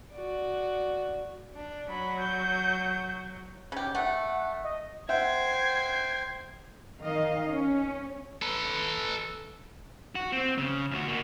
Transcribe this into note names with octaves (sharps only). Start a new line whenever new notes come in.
F#4 D5
D4
F#3 B5
G6
C#3 G4
A3 F#5
D#5
C5 E5 F#5 G5 G#6 C7
D#3 D#5 F5
C#4
A4 B4
F#4
C4
C#3
D2 F#4
A#3 F#4